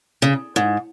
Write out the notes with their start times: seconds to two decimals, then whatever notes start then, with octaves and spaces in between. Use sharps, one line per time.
0.22 C#3
0.56 G#2